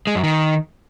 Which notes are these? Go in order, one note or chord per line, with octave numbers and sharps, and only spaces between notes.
G#3
F#2
D#3